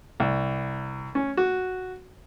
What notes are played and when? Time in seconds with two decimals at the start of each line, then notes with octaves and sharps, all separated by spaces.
0.20 C2
1.15 C#4
1.37 F#4